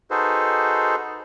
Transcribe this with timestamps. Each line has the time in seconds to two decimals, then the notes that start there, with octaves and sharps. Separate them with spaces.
0.11 D#4 F#4 G#4 A4 B4 C5